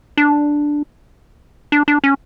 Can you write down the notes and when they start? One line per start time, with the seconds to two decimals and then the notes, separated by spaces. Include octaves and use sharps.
0.17 D4
1.72 D4
1.88 D4
2.04 C#4